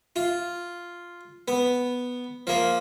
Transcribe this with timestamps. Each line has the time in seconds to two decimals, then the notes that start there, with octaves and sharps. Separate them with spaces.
0.16 F4
1.48 B3
2.47 F3 A#3